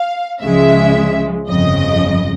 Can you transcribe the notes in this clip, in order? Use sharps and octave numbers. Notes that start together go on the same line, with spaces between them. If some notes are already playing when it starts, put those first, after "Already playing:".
Already playing: F5
C#2 C#3 F3 G#3 E5
G1 F2 C#3 D#5